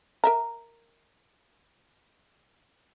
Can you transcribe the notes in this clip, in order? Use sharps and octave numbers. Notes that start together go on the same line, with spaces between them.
A#4 E5 A#5